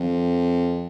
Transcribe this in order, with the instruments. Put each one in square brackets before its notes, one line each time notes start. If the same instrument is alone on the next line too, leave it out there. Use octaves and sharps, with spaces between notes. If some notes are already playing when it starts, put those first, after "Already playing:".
Already playing: [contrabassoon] F2